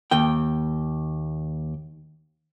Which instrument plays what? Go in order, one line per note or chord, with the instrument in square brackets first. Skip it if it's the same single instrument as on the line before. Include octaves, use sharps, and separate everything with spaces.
[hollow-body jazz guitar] D#2 G5